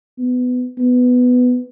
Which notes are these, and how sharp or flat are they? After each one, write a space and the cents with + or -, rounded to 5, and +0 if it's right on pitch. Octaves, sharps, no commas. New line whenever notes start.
B3 +20
B3 +10